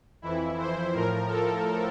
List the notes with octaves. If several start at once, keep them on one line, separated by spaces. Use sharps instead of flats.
F2 E3 E4
C5
A2 F3 A#4
A4